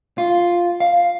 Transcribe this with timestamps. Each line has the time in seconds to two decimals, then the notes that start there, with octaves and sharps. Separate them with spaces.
0.18 F4
0.80 F5